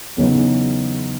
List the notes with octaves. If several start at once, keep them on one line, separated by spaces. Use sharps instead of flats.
E2 C#3 F#3 B3 D#4